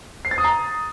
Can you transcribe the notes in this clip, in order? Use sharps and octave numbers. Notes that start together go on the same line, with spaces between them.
C7
A6
D#6
A#5